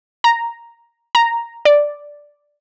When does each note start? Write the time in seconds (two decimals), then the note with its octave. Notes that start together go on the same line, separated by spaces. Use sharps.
0.24 A#5
1.15 A#5
1.65 D5